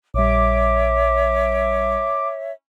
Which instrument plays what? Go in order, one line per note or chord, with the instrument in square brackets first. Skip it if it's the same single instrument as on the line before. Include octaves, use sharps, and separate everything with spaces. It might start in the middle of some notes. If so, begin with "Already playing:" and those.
[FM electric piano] A#1 G3 [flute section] C#5 E5 [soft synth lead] D6